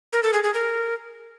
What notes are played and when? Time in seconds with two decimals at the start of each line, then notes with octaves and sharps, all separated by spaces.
0.13 A#4
0.23 A4
0.33 G#4
0.44 G#4
0.54 A#4